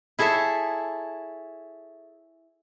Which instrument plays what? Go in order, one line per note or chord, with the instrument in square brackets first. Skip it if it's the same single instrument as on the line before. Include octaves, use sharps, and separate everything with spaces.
[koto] E4 G#4 A4 C#5 E5